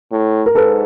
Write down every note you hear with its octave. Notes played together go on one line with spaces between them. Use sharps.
A2
A#4
G#2 A4 B4